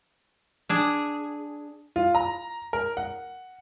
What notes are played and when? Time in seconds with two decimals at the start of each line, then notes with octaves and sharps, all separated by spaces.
0.69 D4 G#4
1.96 F4
2.15 A#5
2.73 A#4
2.97 F#5